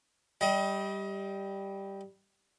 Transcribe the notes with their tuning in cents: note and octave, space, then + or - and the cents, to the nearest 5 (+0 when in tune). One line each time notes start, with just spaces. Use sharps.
G3 +0 D#5 +30